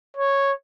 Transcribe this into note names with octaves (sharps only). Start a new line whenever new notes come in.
C#5